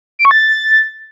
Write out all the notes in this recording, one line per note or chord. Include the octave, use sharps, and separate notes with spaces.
D7
C#6
A6